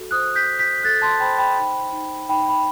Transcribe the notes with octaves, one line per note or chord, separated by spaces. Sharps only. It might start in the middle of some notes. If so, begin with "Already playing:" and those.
Already playing: F#4 A4
C5 D#6 F#6
G6 B6
C5
G6 B6
A4 F#6 A6
A5 C6
C5 G5 B5
G5 B5
D#4
D#4
D#4 G5 B5
G5 B5